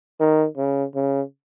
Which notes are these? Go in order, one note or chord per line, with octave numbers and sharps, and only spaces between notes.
D#3
C#3
C#3